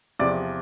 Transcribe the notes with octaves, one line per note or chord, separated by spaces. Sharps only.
E2 C3 F3 D5